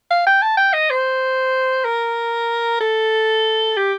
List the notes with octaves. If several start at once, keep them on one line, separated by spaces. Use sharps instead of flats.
F5
G5
A5
G5
D#5
C5
A#4
A4
G4